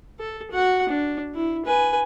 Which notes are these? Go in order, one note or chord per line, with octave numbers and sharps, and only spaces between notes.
A4
F#4 F#5
D4
E4
B4 G#5